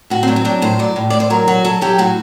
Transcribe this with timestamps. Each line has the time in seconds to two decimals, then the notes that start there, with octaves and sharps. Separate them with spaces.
0.10 A2 F#4
0.23 C4
0.28 F#3 D4
0.36 C4
0.45 F#3 D4
0.62 A2 C5
0.79 F#3 D5
0.96 A2
1.10 A2 D5
1.20 C5
1.30 F#3 A#4
1.47 F#3 F#4
1.64 F#3 A4
1.81 F#3 G4
1.98 A2 F#4